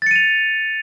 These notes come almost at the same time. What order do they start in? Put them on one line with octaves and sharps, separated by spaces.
A6 C#7 D#7 F7